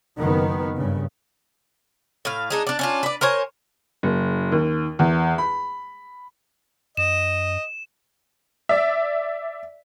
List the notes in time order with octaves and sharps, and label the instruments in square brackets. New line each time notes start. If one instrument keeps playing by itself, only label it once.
[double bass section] F#1 D#3 B3
G2 C#3
[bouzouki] A2 F5
G#3 D4 D#4
D4 D5
C#4 D4 F4
B4 D5
A#4 C5 C#5 G#5
[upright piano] F#1
D#2
E2
B5
[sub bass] F#2 [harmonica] D#5 [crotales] E7
[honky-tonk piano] D5 E5